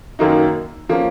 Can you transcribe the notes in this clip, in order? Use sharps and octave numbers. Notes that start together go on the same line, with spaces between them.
F#2 D#3 A#3 D#4
F3 A#3 C#4